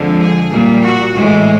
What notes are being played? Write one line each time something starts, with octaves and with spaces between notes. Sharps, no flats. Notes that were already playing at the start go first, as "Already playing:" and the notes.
Already playing: F2 D3 F3 G#3
G#4
A#2 G3
F#4
A2 E3 G#3